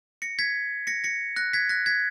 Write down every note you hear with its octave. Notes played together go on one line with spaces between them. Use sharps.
A#6 C#7
G#6 B6
A#6 C#7
A#6 C#7
F#6 A#6
G#6 B6
F#6 A#6
G#6 B6